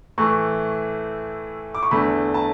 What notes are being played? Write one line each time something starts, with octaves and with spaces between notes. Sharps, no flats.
A2 E3 A3 C#6
D6
C#6
E2 D3 A3 B5
A5